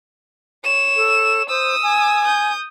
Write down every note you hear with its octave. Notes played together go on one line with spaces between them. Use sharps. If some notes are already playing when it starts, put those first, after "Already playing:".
C#5 E7
A4
C5 D#6 E6
G#5
D#6 G6